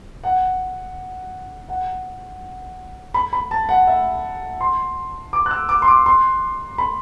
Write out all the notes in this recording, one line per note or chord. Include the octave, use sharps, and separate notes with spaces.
F#5
F#5
B5
B5
A5
F#5
E5
C6
D6
F#6
E6
D6
C6
D6
C6
B5